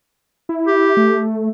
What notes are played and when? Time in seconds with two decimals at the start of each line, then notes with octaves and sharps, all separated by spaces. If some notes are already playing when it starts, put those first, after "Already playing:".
0.49 E4
0.67 G4
0.97 A3